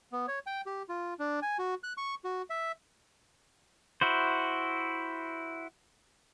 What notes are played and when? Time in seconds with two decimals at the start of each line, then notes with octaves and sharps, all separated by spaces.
0.12 B3
0.28 C#5
0.46 G5
0.66 G4
0.89 F4
1.19 D4
1.42 G#5
1.59 F#4
1.83 F#6
1.97 C#6
2.24 F#4
2.50 E5
4.01 E4 F#4 C5